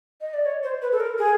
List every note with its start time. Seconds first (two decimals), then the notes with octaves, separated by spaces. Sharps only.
0.21 D#5
0.34 D5
0.46 C#5
0.63 C5
0.82 B4
0.92 A4
1.00 A#4
1.18 G#4